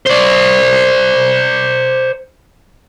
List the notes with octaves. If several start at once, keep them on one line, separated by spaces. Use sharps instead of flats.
C5 D5